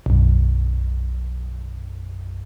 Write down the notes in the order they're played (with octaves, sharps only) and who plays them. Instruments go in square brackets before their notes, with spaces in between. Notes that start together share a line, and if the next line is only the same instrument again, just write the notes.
[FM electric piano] B1 F#2